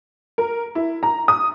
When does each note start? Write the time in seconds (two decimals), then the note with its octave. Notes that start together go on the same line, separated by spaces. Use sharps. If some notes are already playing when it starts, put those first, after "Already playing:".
0.38 A#4
0.75 E4
1.03 A#5
1.28 D#6